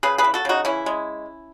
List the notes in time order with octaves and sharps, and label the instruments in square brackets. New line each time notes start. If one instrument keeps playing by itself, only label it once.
[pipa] C#3 G#4 B4
G#4 B4
E3
F#4 A4
C#3 D#4 F#4
E3 C#4 E4
G#3